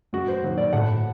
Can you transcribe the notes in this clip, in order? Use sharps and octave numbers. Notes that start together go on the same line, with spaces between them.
F#2 F#4
C5
D#3 F#3 A#3
D5
A2 F#5